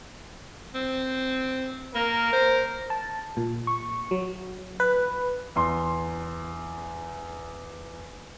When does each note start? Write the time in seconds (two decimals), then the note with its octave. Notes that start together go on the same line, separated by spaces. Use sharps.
0.74 C4
1.95 A#3 A#4
2.33 C5
2.90 A5
3.37 A#2
3.67 C#6
4.11 F#3
4.80 B4
5.56 E2 C6